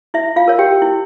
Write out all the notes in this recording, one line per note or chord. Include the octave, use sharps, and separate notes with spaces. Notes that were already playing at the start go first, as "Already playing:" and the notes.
E4 E5
F4 F5
A#4 C#5
G4 G5
E4